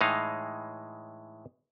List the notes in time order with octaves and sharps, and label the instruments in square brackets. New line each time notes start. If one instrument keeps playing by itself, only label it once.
[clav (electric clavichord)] A2 E3 G#3 D#4 F5